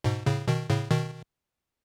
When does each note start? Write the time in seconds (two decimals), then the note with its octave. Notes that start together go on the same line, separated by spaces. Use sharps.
0.04 G#2 B2
0.26 A2 C#3
0.48 B2 D#3
0.70 A2 C#3
0.91 B2 D#3